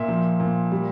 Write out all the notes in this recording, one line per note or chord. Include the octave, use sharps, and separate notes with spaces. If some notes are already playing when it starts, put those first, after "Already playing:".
Already playing: A#2 E5
F3
A#2
G3